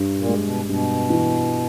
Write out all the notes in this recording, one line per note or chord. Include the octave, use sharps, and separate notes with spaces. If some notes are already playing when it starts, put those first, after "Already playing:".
Already playing: G2
A#2
G#3
B2
G2 B2
E3